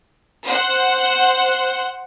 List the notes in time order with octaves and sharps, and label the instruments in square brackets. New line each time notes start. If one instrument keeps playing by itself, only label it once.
[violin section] C5 F#5